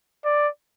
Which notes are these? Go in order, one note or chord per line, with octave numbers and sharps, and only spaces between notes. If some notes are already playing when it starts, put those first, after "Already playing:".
D5